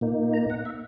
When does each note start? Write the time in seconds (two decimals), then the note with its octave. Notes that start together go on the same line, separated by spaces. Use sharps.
0.01 A#2 A#3 D#4
0.33 A#5
0.50 F#5
0.65 E5